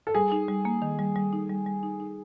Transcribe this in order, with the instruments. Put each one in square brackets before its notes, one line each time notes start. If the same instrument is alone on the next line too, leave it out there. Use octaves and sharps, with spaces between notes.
[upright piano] A4
[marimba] G3 [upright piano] G#4
[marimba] D#4
G3
A#3
D#3
G3
G3
D#4
G3
G3
D#4
D#4